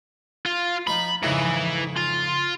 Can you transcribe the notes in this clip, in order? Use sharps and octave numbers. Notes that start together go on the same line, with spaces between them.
F4
F3 D#4 B5
F2 G#2 C#3 E3
F4